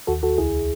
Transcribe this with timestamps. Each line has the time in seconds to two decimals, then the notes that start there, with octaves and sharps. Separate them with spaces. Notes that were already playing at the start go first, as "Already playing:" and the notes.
0.07 D#2 F#4 A4
0.23 D#2 F#4 A4
0.38 C#2 E4 G#4